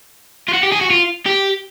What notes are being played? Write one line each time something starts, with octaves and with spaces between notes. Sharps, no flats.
F4
F#4
G4
G#4
F#4
F4
G4